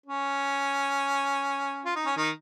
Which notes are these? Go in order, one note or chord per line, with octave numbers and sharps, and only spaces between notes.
C#4
F4
D#4
C#4
D#3 D#4